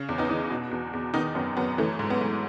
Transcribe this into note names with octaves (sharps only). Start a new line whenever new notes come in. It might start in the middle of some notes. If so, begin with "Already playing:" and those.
Already playing: C#3
E2
B3 D#4
E3
B2
E2
E2
D#3 B3 D#4
F#2 B3
F#2 B3
E3 A3
G#2
B3
G#2